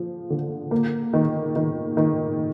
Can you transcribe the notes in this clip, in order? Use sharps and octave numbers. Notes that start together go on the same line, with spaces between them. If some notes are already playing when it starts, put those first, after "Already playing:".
Already playing: F3
D3
A#3
D#3
D#3
D#3